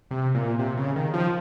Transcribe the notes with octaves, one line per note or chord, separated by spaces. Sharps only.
C3
A#2
C3
C#3
D#3
F3